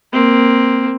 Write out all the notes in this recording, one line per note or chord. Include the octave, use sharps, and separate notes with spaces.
A#3 C4